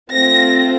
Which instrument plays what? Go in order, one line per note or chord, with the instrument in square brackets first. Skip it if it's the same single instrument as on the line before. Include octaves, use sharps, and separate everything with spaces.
[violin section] A3 C4 F4 A#6